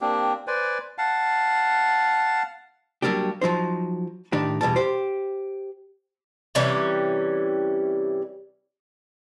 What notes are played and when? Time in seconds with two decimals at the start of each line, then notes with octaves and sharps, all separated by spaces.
0.01 A#3 C4 D4 G4
0.47 B4 C5 D5 G#5
0.98 F5 F#5 A5
3.02 F#3 G3 A#3 D4 G4
3.41 F3 F#3 D#4 C5
4.32 A2 D#3 D4 D#4 G4
4.61 E2 B2 G3 A5
4.76 G4 C5
6.55 C3 E3 G3 C#4